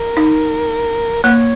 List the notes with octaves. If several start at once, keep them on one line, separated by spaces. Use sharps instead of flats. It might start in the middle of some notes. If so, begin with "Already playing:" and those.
Already playing: A#4
D#4
A#3 C#5